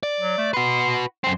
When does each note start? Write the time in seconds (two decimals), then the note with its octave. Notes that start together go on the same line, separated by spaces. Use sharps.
0.03 D5
0.20 F#3
0.38 A3
0.53 F#4 B4 C6
1.24 F#2 C4 C6